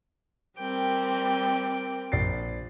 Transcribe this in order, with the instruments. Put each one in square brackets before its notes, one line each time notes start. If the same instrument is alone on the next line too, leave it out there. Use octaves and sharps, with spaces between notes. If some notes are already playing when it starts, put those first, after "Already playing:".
[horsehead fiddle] G3 C4 [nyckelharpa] A#4 G5
[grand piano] A#1 A6 C7